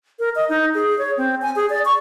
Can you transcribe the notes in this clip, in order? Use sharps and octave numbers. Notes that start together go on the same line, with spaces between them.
A#4
D#5
D#4
G#4
C#5
C4
G#5
G#4
D5
C#6